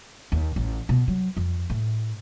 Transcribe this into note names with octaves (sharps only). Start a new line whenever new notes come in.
D#2
A1
B2
F#3
F2
A2